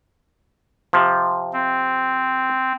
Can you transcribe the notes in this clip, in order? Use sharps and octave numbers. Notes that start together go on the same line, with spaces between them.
C3 F3
C4